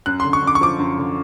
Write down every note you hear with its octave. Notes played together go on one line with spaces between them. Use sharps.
F#2 F#6
C6
D3
C#6
F#2 D6
C#6
F3 D6
F#2
D3